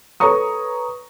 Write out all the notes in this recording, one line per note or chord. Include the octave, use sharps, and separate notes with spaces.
A4 B4 C#5 A#5 C#6 D#6